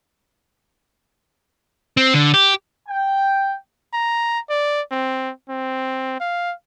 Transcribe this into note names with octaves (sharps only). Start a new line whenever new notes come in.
C4
D3
G4
G5
A#5
D5
C4
C4
F5